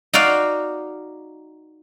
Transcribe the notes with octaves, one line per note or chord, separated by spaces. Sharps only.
D#4 F#4 D5 F5